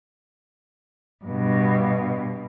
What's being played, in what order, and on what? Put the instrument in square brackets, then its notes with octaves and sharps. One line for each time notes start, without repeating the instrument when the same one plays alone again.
[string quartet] G2 B2